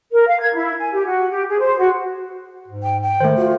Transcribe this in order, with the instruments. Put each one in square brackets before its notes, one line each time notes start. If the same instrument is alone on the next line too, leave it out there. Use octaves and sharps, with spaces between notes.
[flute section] A#4
F5
G#6
E4
G#5
G4
F#4
G4
G#4
C5
F#4
[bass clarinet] G#2
[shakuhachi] G5
G5
[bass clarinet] D#3 [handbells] A3 C5
[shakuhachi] F4 [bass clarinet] F#4